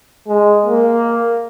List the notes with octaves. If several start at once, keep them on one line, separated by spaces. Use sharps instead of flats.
G#3
A#3